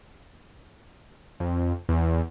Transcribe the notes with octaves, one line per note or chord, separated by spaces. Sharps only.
F2
E2